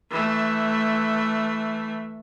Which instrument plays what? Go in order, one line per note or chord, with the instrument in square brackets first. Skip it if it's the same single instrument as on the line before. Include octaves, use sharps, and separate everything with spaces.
[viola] E3 A3